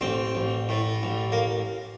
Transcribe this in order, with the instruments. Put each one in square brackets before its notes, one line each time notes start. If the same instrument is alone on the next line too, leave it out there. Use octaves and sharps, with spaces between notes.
[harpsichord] A1 C4
A1
A2
A1
A#3